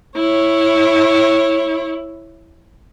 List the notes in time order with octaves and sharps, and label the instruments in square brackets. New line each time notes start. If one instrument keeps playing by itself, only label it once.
[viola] E4 C#5